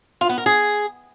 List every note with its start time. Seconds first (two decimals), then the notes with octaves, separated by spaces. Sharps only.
0.21 F4
0.29 B3
0.38 A#4
0.46 G#4